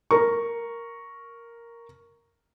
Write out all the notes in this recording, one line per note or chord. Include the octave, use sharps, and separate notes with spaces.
A#4 C#6